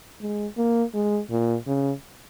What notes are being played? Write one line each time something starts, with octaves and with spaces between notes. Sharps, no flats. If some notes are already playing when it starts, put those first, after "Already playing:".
G#3
A#3
G#3
A#2
C#3